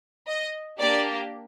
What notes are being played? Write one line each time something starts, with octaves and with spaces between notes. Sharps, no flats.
D#5
A#3 D4 G4 D5